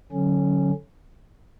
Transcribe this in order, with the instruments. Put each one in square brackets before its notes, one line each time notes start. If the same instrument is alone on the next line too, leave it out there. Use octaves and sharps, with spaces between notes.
[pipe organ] D3 F#3 C#4